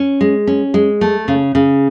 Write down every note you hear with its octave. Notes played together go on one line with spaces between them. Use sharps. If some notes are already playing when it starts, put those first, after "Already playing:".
Already playing: C#4
G#3
C#4
G#3
A3
C#3
C#3